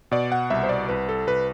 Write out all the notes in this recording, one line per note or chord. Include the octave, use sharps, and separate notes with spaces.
B2 D5
F#5
C2 E5
C5
D5
C2 B4
A4
C2 B4